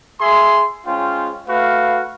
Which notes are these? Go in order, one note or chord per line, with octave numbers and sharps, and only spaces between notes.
G#4 E5 C6
G#3 C#4 F4 C5 G5
A3 F#4 B4 F5